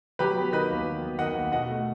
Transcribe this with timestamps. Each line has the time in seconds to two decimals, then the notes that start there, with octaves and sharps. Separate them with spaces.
0.19 F#3 G4 B4
0.36 B3
0.53 D#3 B4 D#5
0.70 D#2
0.85 F#3
1.02 B3
1.19 D#3 D#5 F#5
1.35 D#2
1.52 B2 D#5 F#5
1.69 A3